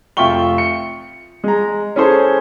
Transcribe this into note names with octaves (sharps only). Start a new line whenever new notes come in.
F1 F4 E5 G5 C#6 G7
C#7
G#3 A#5
C#4 E4 G#4 A4 C5 G#5